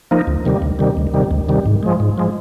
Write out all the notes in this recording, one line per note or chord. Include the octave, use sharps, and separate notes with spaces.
F3 A#3 D#4
D2
C3 D#3 G3
D2
C3 D#3 G3
D2
C3 D#3 G3
D2
C3 D#3 G3
G#2
F3 G#3
G#2
F3 G#3